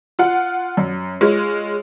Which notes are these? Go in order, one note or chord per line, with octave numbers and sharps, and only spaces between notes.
F4 F#5
F#2
G#3 F4 C#5